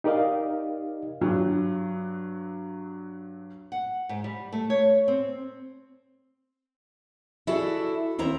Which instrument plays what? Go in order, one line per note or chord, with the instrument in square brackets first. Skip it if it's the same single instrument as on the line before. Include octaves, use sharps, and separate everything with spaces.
[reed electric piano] D#4 G4 A#4 D5 D#5 F5
[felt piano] G2 F#3
[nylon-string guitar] F#5
G#2
G3
A3
C#5
C4
[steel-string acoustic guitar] E4 F#4 G#4 A4 D5
D#2 C4 E4 A#5